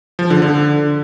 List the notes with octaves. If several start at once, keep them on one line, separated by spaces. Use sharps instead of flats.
F3
D3
D3